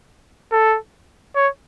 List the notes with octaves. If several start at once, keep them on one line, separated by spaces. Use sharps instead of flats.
A4
C#5